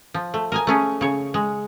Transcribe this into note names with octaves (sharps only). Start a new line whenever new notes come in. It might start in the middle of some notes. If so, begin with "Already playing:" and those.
F3
A3
A#4 D#5 G#5
A3 C#4 G#4
C#3 C#5
G#3